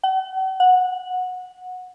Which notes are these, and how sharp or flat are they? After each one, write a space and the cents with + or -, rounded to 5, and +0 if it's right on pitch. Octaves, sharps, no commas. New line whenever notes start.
F#5 +45
F#5 -15